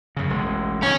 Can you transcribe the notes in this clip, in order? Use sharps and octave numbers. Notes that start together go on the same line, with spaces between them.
F#2 C#3
E1 A1 G#3
B2 D#3 C#4